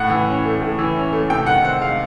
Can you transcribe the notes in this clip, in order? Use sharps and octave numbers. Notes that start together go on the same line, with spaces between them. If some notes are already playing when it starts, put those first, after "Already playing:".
Already playing: A2 F#5
E3
C#4
A3
A2
E3
C#4
A3
C3 G5
D#3 F#5
C4 F#5
G#3 F5